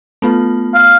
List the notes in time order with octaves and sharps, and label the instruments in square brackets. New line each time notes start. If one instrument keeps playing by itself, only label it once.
[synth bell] A3 B3 F4
[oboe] F5